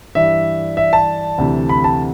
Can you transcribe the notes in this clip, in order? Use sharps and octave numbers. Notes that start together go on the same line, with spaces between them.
G2 E3 E5
E5
A5
D2 C3 E3
B5
A5